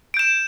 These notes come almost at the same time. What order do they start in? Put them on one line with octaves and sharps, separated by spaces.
D7 G6 E7